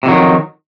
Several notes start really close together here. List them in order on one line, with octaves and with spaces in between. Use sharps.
C3 F2 F#3 D#3